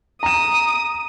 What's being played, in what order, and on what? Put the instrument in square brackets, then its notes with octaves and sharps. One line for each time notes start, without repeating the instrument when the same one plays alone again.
[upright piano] A#5 E7 [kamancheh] D#6